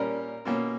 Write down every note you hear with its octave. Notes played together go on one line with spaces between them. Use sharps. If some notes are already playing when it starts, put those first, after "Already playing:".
Already playing: A#2 G3 C#4 A#4
B2 A#3 C#4